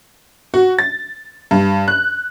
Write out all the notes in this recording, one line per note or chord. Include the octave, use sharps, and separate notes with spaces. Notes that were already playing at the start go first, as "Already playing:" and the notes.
F#4
A6
G2
F#6